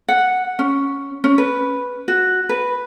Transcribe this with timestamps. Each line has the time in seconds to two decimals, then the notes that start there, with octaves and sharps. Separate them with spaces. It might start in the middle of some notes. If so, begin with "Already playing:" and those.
0.09 F#5
0.59 C#4
1.24 C#4
1.38 B4
2.08 F#4
2.49 B4